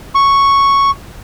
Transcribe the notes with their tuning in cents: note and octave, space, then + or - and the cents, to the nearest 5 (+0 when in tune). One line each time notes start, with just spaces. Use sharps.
C#6 +0